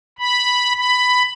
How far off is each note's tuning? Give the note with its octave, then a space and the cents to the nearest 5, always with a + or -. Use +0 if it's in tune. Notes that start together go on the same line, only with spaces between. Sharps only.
B5 -5
B5 +10